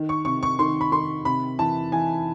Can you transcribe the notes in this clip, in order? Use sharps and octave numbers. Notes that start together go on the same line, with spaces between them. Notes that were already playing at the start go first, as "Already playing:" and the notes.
Already playing: D#3
C#6
C3 C#6
C#6
D#3 C6
B5
D#3 C6
C3 B5
E3 A5
E3 G#5